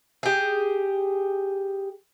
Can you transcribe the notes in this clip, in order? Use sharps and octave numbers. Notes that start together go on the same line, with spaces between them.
G4 G#4